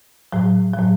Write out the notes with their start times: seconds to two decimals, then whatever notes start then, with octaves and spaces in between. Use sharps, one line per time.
0.33 A2 F#3
0.73 F#3
0.79 A2